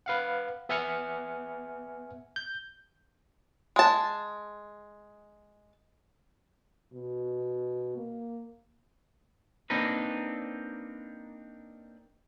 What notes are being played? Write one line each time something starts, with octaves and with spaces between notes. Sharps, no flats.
B4 F5 F#5
B3 E5 G#5 F6 C#7
G6
G#3 A5
B2
A#3
A#3 C4 D4 D#4 B4